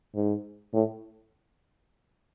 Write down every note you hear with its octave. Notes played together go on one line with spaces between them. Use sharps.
G#2
A2